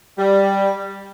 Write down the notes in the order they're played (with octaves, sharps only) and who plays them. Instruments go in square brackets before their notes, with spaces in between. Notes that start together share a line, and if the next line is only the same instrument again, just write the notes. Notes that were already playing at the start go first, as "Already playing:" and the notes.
[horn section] G3